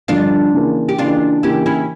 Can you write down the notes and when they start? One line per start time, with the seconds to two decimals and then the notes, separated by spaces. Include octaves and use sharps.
0.08 G2 D3 F3 D4 F4
0.54 C#3 E3 A#3
0.89 G4
0.98 C#3 E3 A#3 D4 F4
1.43 C#3 E3 A#3 E4 G4
1.66 C#4 E4